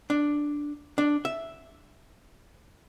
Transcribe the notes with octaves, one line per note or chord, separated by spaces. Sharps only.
D4
D4
E5